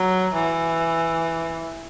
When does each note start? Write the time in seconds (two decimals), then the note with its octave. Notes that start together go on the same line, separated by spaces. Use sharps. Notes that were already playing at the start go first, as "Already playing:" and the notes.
Already playing: F#3
0.35 E3